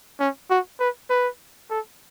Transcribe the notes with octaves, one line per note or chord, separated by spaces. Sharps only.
C#4
F#4
B4
B4
A4